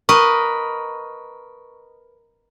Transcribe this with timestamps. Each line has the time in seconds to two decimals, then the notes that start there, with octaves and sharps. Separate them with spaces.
0.09 A#4 B4 D#5 C#6